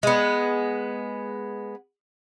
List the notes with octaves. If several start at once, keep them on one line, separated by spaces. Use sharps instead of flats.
G#3 B3